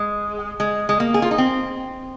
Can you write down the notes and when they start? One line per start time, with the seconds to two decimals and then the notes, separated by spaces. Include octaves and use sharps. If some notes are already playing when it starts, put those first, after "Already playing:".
Already playing: G#3
0.60 G#3
0.89 G#3
1.00 A#3
1.14 G#4
1.22 F4
1.31 D#4
1.38 C4